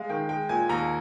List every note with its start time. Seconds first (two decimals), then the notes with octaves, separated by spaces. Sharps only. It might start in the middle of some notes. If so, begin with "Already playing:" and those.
Already playing: G#3 F5
0.10 D#3 G5
0.29 G#3 G5
0.49 A#2 G#5
0.69 D#2 A#5